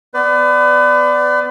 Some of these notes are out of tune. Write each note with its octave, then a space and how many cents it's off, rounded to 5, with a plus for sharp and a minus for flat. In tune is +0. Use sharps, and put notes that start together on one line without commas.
B3 +20 B4 +35 D5 +0